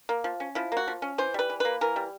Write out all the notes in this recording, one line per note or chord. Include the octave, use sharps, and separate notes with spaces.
A#3
F3
C#4
F3 E4
A#3 F#4
F3
C#4
E3 C5
G3 B4
E3
A#3 B4
E3 A#4
G3